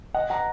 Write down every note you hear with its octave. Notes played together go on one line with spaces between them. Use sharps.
D#5 F#5
F#5 A#5